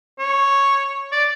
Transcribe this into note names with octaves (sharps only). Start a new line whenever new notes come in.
C#5
D5